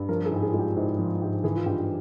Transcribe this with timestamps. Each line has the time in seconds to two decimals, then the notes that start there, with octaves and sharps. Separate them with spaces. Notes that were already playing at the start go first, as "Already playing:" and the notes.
Already playing: G2
0.09 F3 A#4
0.26 G#4
0.31 G#2 G4
0.42 G#4
0.51 F4
0.54 G#3
0.59 G4
0.76 G#2 E4
0.99 F3 F4
1.22 G#2 G4
1.44 E3 G#4
1.56 F4
1.66 G2 G4